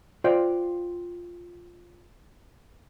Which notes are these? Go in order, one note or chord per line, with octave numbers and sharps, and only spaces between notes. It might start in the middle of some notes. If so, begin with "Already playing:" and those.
F4 C5 D5 F5 G5